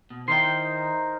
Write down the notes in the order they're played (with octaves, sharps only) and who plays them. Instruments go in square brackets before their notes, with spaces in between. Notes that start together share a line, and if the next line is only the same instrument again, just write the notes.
[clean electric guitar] B2
[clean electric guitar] D#3 E4 G5 [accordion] D#4 A#4 C5 [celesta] C6 C7